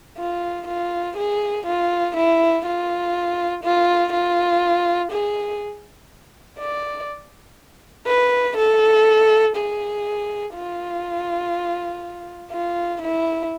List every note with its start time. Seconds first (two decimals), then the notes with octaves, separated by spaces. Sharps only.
0.17 F4
0.67 F4
1.17 G#4
1.66 F4
2.16 E4
2.65 F4
3.64 F4
4.12 F4
5.11 G#4
6.59 D5
8.07 B4
8.57 A4
9.56 G#4
10.54 F4
12.52 F4
13.02 E4